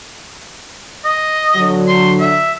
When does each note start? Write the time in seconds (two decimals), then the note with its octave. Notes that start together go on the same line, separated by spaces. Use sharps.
1.05 D#5
1.56 D3 F#3
1.87 C6
2.20 E5